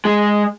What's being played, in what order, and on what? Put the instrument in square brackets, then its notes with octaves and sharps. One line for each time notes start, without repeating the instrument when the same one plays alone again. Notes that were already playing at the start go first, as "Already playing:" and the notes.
[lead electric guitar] G#3